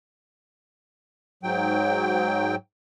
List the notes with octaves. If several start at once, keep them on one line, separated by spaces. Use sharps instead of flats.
G#2 F#3 G5